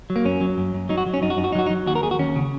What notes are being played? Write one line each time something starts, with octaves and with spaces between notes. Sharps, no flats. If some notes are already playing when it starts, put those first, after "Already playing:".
F#3
A#3
F#2 C#4
F#3
F#2
F#2
F#3 D#4
F#4
F#3
C#4
F#2 D#4
F#4
F#2 D#4
F#4
D#4
F#3 F#4
D#4
F#3
D#2 F#4
A#4
D#2 G#4
F#4
D#2 C#4
C#3